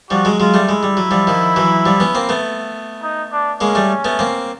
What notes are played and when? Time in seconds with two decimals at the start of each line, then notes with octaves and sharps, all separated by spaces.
0.11 F3 G3 F#4
0.25 F#3 G#3
0.40 F#3 G#3 F4
0.54 G3 A3
0.69 G#3 E4
0.83 G3
0.97 F#3
1.11 F3 G3
1.27 D#3 F3
1.56 E3 F#3
1.86 F3 G3
2.00 B3 C#4
2.15 A#3 C4
2.29 A3 B3
3.03 D#4
3.32 D4
3.61 G#3 A#3 C#4
3.75 G3 A3
4.04 A3 B3
4.19 A#3 C4